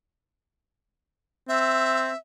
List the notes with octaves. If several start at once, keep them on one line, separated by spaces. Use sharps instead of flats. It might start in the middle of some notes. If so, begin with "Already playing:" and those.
C4 E5